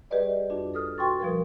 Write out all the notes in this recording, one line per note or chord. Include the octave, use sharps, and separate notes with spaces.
G3 G4 G#4 B4 D5 D#5
F2 D4 F#4
A4 D#6 F6
B2 F#4 G5 C6 C#6 A6
B2 F3 G3 A#4